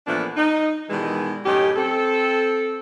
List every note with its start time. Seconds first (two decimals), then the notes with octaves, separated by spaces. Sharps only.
0.06 A#2 E3 F3 A3 B3 D4
0.37 D#4
0.90 B2 D#3 E3 G3 G#3
1.45 F#2 A2 C#4 D#4 G4
1.76 C4 A4